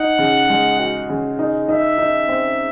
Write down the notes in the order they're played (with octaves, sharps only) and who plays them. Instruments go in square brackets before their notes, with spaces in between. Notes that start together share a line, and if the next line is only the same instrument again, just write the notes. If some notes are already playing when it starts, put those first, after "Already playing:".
Already playing: [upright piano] D#4 [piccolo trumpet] F#5
[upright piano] C#3
G#3
F#4
C#3
D#4
[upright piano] D#4 [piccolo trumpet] E5
[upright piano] D#4
C4